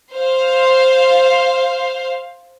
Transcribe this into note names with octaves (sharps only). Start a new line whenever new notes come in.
C5 F5